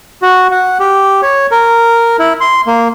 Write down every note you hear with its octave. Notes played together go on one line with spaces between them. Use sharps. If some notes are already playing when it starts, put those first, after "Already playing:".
F#4
F#5
G4
C#5
A#4
E4
C6
A#3